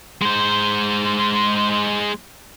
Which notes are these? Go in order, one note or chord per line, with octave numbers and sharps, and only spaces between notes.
G#3 C5